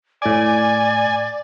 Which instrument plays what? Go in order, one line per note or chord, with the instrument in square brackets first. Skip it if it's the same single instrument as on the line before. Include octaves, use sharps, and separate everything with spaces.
[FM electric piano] A2 D6 [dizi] D5 [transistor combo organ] G#5